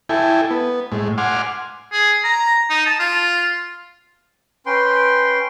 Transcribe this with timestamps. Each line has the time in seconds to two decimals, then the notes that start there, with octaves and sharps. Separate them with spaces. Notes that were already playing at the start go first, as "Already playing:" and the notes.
0.09 E4 A4 G5 G#5
0.51 B3
0.92 A2 G#3
1.18 F#5 G#5 C6 D6 F6
1.93 G#4
2.24 A#5
2.70 D#4
2.86 A5
2.99 F4
4.66 C#4 B4 G5 C6